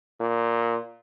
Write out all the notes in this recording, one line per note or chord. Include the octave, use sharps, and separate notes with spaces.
A#2